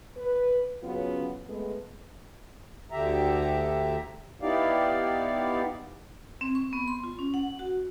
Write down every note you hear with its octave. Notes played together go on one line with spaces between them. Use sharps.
B4
C#3 F#3 B3 C#4 F4
G#3 A3 B3
D2 D3 G4 E5 A#5
B3 D#4 E4 G4 D5 F5
C4
C#6
B3
C6
F4
C#4
F#5
F#4